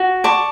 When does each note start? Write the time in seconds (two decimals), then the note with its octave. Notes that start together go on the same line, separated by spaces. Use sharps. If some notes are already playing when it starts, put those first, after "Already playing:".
Already playing: F#4
0.24 D5 A5 C#6